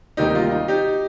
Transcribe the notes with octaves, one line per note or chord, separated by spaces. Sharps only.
D2 C3 D#3 G3 A#3 D#4 G4
F4
D#4
D#4 G4